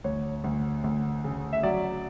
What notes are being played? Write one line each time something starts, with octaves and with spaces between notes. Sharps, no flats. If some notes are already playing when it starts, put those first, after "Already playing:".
D2 C#5
D2
D2
C#3
E5
F#3 D5